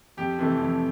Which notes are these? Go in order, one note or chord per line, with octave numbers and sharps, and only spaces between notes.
F2 G4
C3 E3 A3
F2